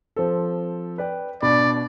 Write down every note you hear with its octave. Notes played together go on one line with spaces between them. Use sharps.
F3 C4 A4
B4 D5 G5
B2 D4 D5 B5